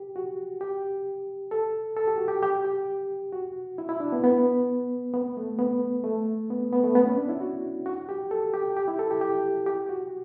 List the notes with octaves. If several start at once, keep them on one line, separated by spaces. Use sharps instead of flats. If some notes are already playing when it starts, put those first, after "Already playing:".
Already playing: G4
F#4
G4
A4
A4
G4
F#4
G4
G4
G4
F#4
E4
E4
D4
B3
B3
B3
A3
B3
A3
B3
B3
A3
B3
C#4
D4
E4
F#4
F#4
G4
A4
G4
G4
E4
A4
G4
G4
G4
F#4